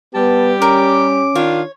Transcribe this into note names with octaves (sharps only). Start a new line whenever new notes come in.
G3 B3 G4 A5
C#4 A#4 D6
D#3 D4 F4 C#5